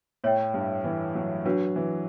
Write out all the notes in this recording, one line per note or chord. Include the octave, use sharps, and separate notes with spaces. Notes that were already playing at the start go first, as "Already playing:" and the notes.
A2 C#5 E5 G5
G2
E3
F#3
F#3 D4 F#4 B4
E3